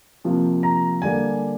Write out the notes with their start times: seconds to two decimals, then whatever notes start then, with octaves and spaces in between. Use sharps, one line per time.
0.24 C3 F3 A#3
0.63 A#5
1.02 D3 G3 A#3 G#5